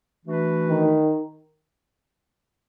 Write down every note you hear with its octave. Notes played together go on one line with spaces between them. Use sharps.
E3 A3 D4 F#4 B4
D#3